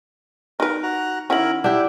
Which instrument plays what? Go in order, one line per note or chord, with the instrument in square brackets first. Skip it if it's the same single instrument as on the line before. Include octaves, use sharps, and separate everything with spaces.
[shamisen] D#4 B4 [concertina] A#4
[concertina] F#4 A#5
[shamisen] D#3 C#4 [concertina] E4 A#4 [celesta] F#5 F6 F#7
[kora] D4 G4 [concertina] E4 [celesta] F#5